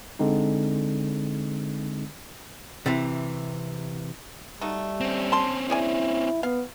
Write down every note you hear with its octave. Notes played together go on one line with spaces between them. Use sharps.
D3 G#3 C4 D#4
C3 E3
G3 A3 D#4 F#4
C4 C#4
A5 C6
E4 G#4 D5 G#5
B3 F5